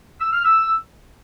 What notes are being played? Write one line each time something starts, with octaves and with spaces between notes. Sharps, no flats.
E6
F6
E6